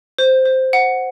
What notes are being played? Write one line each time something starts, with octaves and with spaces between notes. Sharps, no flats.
C5
C5
F#5